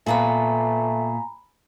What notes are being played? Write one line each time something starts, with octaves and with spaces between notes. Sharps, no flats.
A#2 A3 B3 G#5 A#5 B5